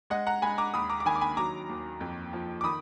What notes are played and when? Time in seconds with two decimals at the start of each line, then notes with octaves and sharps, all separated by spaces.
0.10 G#3 D#5 F#5
0.27 F#5 A#5
0.42 G#3 G#5 B5
0.58 A#5 D6
0.74 D#2 B5 D#6
0.90 A#5 D6
1.00 D6
1.05 D#3 G#5 B5
1.16 D6
1.21 G#5 B5
1.37 F#3 A#5 D6
1.69 D#2
2.01 F2
2.33 F3
2.61 D6
2.64 D#3 B5 D#6